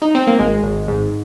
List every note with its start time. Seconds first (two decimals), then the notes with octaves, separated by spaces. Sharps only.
0.02 D#4
0.15 C4
0.27 A#3
0.39 G#1 G#3
0.63 G#1
0.88 G#2